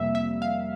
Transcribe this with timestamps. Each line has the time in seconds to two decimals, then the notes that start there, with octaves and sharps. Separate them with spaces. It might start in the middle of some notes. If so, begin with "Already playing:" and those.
Already playing: F2 C3 G3 A#3 E5
0.15 E5
0.42 F5